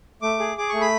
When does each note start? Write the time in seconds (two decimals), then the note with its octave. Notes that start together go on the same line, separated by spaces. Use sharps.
0.22 A3 D6
0.39 G#4
0.57 G#4 D6
0.69 A3 C#6
0.81 B5